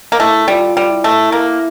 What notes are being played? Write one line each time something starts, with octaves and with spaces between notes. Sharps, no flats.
A#3
A3 E4
G3 F4
G3
E4
A3
A#3